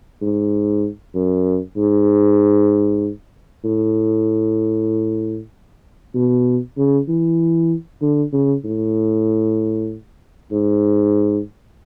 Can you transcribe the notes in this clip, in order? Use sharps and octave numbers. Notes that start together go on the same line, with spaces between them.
G#2
F#2
G#2
A2
B2
C#3
E3
D3
C#3
A2
G#2